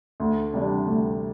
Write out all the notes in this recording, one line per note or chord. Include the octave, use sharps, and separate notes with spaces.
D2
C3 G3 D4
D2